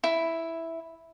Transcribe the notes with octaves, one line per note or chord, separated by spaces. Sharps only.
E4